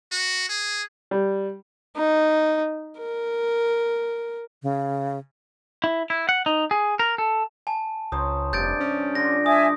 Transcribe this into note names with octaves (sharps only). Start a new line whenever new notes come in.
F#4
G#4
G3
D#4
A#4
C#3
E4
E4
F#5
D#4
G#4
A#4
A4
G#5 A5
C#2 C5 C#5 A#5 D#6
F1 G2 C3 G6 A6 D7
C#4
D3 D4 F4 A#6
E5 G#5 D#6